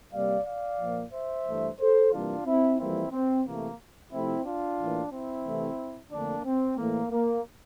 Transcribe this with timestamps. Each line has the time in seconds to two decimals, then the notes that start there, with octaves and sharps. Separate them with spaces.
0.13 C3 G3 A#3 D5 F5
0.46 D5 F5
0.79 A#2 F3 A#3
1.13 C5 E5
1.47 G2 E3 A3
1.80 A4 C5
2.12 C3 E3 G3 A#3 D4 F4
2.46 C4 E4
2.79 F2 E3 G3 A#3 C4 E4
3.12 C4
3.46 C3 E3 A3 A#3
4.12 C3 F3 A3 C4 E4
4.45 D4 F4
4.79 A2 E3 A#3
5.13 C4 E4
5.45 C3 E3 A3
6.12 F2 D3 A3 A#3 D4
6.45 C4
6.78 A2 E3 A3 A#3
7.11 A#3